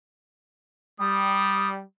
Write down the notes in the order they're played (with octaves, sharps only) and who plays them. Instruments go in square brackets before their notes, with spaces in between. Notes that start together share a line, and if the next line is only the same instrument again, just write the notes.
[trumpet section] G3 [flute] D#6